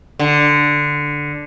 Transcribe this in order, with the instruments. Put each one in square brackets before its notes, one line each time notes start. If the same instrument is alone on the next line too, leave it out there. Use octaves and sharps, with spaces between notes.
[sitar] D3